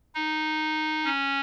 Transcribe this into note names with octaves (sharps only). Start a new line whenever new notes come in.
D#4
C#4